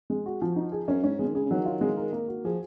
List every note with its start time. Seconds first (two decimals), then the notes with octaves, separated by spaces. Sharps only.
0.10 G#3
0.26 F#4
0.42 F3
0.56 D#4
0.72 G#4
0.88 F#2 C#4
1.03 G#2 C#4
1.19 B2 G#3
1.29 D#3
1.35 C#3 G#4
1.46 C#3
1.50 D#3 F#3
1.66 F4
1.81 G#3
1.97 A#4
2.12 A#3
2.28 F#4
2.44 F3 G#4